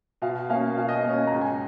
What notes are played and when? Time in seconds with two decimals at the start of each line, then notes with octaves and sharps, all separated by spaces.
0.22 B2 F5
0.49 A#3 C#4 F5
0.77 B2 F5
0.88 D#5
0.95 F5
1.05 A#3 C#4
1.14 G#5
1.27 A#5
1.32 C#2
1.41 G#5